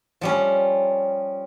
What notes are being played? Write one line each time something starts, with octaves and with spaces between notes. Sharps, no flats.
F3 G3 C#4